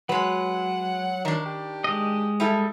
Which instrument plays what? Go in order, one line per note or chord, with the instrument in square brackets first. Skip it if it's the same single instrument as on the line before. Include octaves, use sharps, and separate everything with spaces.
[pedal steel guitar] F#3 [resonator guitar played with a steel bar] G#3 B4 [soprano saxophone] F#5
[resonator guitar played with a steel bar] D#3 D4 [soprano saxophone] A#4
[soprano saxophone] G4
[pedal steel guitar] G#3 D#5
[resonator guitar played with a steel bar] G3 E4 A4